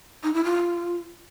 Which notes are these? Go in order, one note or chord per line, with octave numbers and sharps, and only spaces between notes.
D#4
E4
F4